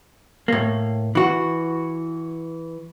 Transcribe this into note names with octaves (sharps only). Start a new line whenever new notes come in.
A2 A#3
E3 F#4